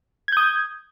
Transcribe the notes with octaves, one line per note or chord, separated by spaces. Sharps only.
D#6 G6 G#6